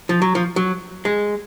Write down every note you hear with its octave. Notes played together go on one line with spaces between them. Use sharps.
F3
F#3
F3
F#3
G#3